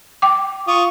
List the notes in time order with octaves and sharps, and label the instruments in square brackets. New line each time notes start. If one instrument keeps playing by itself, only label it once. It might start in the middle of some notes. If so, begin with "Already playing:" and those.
[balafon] G5 D6
[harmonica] F4 C#6 D#6